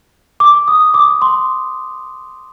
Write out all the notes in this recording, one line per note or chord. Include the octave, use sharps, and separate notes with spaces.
D6
D#6
D6
C6